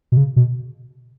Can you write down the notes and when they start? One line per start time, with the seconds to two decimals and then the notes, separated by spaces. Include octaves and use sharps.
0.12 B2
0.17 C#3
0.36 B2